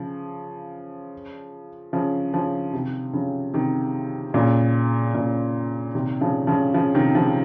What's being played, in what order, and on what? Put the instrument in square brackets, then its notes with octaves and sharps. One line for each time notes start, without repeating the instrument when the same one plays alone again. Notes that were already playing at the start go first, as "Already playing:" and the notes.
Already playing: [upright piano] C#3 F3
C#3 F3
C#3 F3
C3 D#3
C#3 F3
C3 D#3
A#2 C#3
A#2 C#3
C3 D#3
C#3 F3
C#3 F3
C#3 F3
C3 D#3
C#3 F3